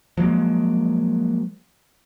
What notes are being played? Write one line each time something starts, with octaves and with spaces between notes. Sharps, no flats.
F3 F#3 G#3 A#3